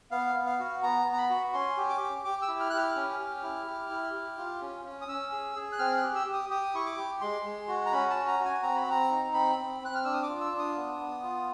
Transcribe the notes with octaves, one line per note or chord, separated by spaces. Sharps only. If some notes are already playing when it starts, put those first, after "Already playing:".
B3 F5
B3
F5
F#4
B3 A#5
B3
A#5
B5
F#4
C#4 C6
G4
D6
G4
G4 D6
E6
E4
F6
G4 F#6
F6
C#4 F6
G4
E4
G4
E4
G4
F4
C#4
C#4
D#6
C#4 E6
G#4
G#4
F#6
C4 F6
F#6
G4
E6
G4
D#6
G4 D#6
E4 C#6
D6
G4
G#3 C6
G#3
F#4
A#5
C#4 B5
A5
F#4
A#5
F#4
G#5
C4 A#5
B5
C4 A#5
D#4
C4 B5
C4
C4 F#6
F6
D4 E6
D#6
D6
F4
E6
D4
D#6
B3
B3
F4